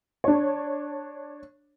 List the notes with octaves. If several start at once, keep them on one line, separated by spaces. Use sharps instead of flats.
D4 C#5